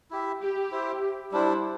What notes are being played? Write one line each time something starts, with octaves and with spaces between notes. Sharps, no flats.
E4 G4 E5
G4
E4 C5 E5
G3 D4 E4 C5